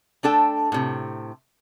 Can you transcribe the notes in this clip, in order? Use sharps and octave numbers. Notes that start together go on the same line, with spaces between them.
A3 D4 A4 G5
A2 C3